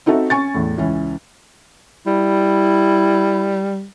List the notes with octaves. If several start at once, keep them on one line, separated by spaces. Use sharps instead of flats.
C4 D#4 F#4 A4 E5
C#4 G#5 C#6 A6
E2 A2
C#2 E3 C#4
G3 E4